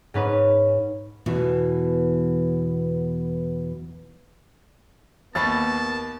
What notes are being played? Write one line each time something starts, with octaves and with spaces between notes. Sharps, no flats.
G#2 C#4 B4
E2 B2 E3
D#2 A#3 B3 A5 B5 C#6 A6